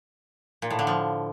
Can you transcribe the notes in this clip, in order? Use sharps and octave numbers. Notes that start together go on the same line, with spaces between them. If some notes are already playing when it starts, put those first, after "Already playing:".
A#2
A2
D3
F3